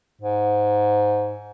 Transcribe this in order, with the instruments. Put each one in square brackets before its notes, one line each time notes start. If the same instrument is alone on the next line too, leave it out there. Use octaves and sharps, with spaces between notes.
[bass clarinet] G#2